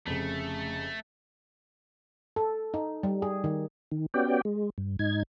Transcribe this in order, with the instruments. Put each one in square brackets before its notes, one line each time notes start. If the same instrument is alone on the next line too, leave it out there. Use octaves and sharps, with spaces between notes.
[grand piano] F1 C#3 [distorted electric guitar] A3
[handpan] A4
D#4
G3
G#4
D#3
[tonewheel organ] D#3
B3 C#4 F#4 G4 D5 G5
G#3
G2
G#2 D#4 G#6